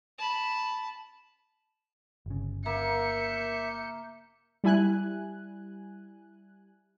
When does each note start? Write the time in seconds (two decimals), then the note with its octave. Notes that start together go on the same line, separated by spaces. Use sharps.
0.19 A5 B5
2.26 G1 C#3
2.66 A#3 E5 G6 C#7
4.64 G3 E4 G#5 F#6